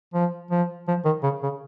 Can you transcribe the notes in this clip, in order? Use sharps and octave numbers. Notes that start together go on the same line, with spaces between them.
F3
F3
F3
D#3
C#3
C#3